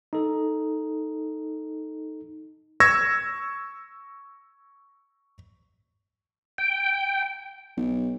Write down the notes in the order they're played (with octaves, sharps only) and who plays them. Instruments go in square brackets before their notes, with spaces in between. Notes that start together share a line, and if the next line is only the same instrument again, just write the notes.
[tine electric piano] D#4 A4
[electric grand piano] C#6 E6 G#6 A#6
[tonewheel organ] G5
[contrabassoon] B1